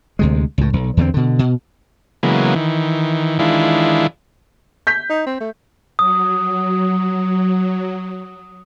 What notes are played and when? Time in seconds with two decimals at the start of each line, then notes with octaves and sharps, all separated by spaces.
0.19 D2 C3 G#3
0.58 C#2 A2
0.73 B1
0.97 E2 D3 A3 C4
1.14 B2 D3
1.39 B2
2.23 C#3 E3 F#3 G#3 A#3 B3
2.56 D#3 E3
3.39 D#3 E3 G#3 D4 E4 F4
4.87 G6 B6
5.10 D#4
5.26 C4
5.40 A3
5.99 F#3 D#6